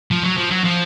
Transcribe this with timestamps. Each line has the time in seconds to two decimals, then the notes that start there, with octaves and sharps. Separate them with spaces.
0.11 F3
0.24 F#3
0.37 F3
0.51 F#3
0.64 F3